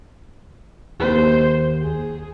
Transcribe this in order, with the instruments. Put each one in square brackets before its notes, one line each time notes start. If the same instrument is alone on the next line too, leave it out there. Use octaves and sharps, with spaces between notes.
[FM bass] D#2 [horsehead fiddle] C5
[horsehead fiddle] G#4